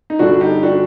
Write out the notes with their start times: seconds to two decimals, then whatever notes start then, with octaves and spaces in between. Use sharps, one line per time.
0.10 D#4
0.19 G1 G2 D3 D4 F#4
0.41 D#4 G4
0.63 D4 F#4